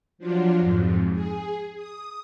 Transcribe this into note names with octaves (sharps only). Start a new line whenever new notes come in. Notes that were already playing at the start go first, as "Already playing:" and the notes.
F3 F#3 D4 F4
F2 G#2
G#4
D#6